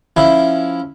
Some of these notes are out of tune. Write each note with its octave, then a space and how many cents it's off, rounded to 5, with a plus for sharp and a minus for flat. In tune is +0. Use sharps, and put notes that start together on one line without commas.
F3 +0 C#4 +0 E4 +0